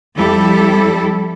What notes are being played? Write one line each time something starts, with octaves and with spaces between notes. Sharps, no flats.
F2 G3 E4 A4